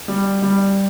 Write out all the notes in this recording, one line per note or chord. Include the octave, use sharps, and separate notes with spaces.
G3
G3